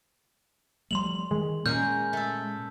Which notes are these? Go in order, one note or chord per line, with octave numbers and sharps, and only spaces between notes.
F3 G3 A3 C6 F7 F#7
D#3 G#3
A#2 G#3 C#4 G#4 A#4 F6 G6
A3 A4